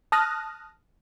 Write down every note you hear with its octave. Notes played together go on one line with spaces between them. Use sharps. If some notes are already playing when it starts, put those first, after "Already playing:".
A5 D#6 F6 F#6 A#6